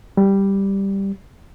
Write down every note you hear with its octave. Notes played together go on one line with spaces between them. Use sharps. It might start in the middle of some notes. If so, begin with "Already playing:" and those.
G3